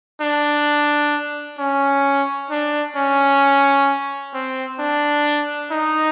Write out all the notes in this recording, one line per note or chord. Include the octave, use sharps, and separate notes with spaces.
D4
C#4
D4
C#4
C4
D4
D#4